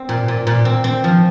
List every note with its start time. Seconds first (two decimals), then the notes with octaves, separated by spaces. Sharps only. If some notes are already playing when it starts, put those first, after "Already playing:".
Already playing: C4
0.09 A#2
0.28 A#2
0.47 A#2
0.65 C4
0.84 C4
1.04 F3